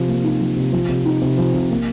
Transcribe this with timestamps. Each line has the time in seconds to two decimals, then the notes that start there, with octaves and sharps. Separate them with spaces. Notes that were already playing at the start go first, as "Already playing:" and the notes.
Already playing: C3 F3
0.08 A#3
0.24 D#4
0.40 F3
0.56 C3
0.72 F3
0.89 C3
1.05 D#4
1.22 C3
1.38 F3
1.54 C3
1.71 A#3